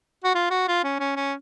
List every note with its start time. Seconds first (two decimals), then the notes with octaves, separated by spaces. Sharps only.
0.24 F#4
0.35 F4
0.51 F#4
0.68 F4
0.84 C#4
1.00 C#4
1.16 C#4